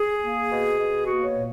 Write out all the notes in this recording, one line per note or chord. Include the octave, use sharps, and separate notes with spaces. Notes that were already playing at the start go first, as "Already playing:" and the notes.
Already playing: G#4
A#3
B2
B2
A#3 F#4
C#5
A#2